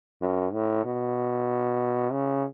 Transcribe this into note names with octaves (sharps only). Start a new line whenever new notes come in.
F#2
A2
B2
C#3